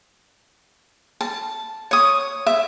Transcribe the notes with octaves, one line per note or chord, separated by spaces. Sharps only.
A5
C#5 D#6
E5